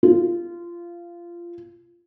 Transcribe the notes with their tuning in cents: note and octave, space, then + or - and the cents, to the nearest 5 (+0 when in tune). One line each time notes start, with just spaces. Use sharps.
F4 -20